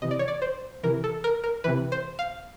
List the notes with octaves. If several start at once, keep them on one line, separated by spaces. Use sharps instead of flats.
C3 E3 D#5
D5
C#5
D5
C5
C3 E3 A#4
A4
A#4
A#4
C3 E3 B4
C5
F5